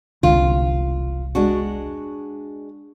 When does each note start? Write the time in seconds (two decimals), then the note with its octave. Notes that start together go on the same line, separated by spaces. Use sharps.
0.23 E1 C2 D3 F4
1.35 G#3 D4 F#4